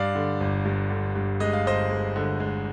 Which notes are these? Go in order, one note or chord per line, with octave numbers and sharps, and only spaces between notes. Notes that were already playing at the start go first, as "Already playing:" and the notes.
Already playing: G2 D5 F5
D3
G1
G2
D3
G2
G#3 D#5
F5
G1 C5 D#5
G#3
D3
G#3